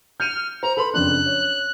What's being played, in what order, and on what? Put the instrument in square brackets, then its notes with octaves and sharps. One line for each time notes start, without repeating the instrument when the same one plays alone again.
[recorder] F6 [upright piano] G6 C#7 D#7
[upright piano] C5 [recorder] A#5
[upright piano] A4 B4 C6 [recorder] B5
[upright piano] F#1 F2 D4 [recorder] F#6
[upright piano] C#5